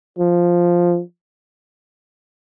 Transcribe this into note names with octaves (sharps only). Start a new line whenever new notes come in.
F3